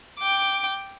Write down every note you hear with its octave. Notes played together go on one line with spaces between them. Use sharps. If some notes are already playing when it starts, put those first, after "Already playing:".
G5 D6